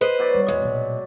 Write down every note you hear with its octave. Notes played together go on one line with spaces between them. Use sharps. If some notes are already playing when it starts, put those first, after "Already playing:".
B4 C5 D#5
B2 F#3 D5
G3
E2 G#3
B1 A#2